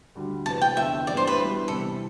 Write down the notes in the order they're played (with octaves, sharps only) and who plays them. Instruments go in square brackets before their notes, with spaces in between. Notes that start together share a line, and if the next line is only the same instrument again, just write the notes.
[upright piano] D2 D3 G3
[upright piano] E2 C3 E3 B3 [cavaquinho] A5
[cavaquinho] G5
[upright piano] E2 D3 F3 [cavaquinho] E5
[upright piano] G2 E3 B3 D4 [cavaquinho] D5
[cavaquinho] C5
B4
[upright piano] B2 G3 B3 E4
[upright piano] C3 E3 G3 [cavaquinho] A4